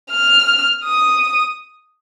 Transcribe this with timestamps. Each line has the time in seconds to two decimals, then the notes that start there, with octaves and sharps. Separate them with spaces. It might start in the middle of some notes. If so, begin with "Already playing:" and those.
0.10 F6
0.85 D#6